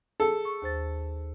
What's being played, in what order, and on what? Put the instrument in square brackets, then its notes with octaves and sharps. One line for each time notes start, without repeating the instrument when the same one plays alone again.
[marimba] G#4 [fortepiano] A4
[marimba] C#6
D#2 C5 A6